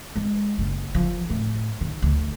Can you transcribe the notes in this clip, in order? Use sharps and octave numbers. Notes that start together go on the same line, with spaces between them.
G#3
F#1
F3
A2
D#3
D2